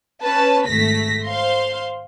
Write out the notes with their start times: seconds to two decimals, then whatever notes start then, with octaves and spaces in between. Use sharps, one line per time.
0.23 C#4 B4 A5
0.68 G#1 A3 A#6 B6
1.26 C5 F5 C6